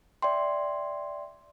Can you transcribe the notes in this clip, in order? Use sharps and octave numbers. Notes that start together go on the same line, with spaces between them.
D5 E5 G5 C6